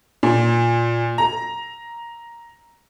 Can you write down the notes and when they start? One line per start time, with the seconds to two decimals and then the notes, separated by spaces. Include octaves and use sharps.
0.23 A#2
1.18 A#5